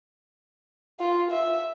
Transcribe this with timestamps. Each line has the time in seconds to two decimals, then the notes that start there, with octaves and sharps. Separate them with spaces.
1.00 F4
1.31 E5